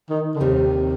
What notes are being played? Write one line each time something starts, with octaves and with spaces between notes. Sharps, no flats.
D#3
D3
D#2 C3 D#3 G3 C4